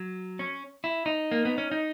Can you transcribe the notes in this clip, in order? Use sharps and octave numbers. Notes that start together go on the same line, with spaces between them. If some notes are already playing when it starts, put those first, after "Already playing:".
Already playing: F#3
C#4
E4
D#4
A#3
B3
C#4
D#4